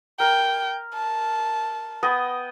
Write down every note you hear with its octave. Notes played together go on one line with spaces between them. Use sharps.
A#4 G5
A5
B3 D#5 G5